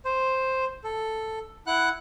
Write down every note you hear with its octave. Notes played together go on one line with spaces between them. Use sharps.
C5
A4
E4 F#5 F#6